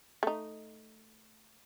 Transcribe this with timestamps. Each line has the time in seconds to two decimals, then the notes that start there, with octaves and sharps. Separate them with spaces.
0.23 A3 D#4